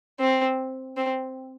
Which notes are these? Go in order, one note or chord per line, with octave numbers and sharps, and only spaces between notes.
C4
C4